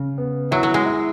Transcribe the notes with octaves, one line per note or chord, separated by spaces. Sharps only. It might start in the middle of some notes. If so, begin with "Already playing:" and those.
Already playing: C#3
B3
F#3 E4
F#3
G#3
E4